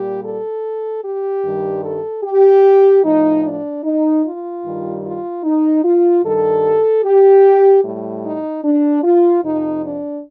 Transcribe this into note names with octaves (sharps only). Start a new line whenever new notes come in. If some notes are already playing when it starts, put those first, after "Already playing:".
Already playing: A#2 G3 G4
A4
G4
G2 D#3 G3
A4
G4
A2 F3 D#4
D4
D#4
F4
G2 D#3 G3
F4
D#4
F4
G2 D#3 G3 A4
G4
A2 G3
D#4
D4
F4
F2 C3 F3 D#4
D4